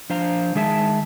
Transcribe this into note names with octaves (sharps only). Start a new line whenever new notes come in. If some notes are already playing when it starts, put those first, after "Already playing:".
F3 D4 C5 F5 A#5
D#3 G#3 G#4 E5 A5